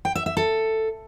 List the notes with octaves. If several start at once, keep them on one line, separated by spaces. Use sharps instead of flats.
G5
E5
E5
A4